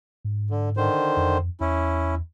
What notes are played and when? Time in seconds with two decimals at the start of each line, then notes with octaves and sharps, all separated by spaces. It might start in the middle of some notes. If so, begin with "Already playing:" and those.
0.25 G#2
0.51 D3
0.77 D3 D#3 C5
1.17 F2
1.60 E2 C#4 E4